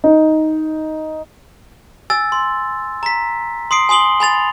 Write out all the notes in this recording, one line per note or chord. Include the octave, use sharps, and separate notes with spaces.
D#4
G#5 E6 A6
C6
A#5 B6
C6 D#6 C7 D7
G#5 C6 D#6 F#7 G7
G#5 B5 A6 F7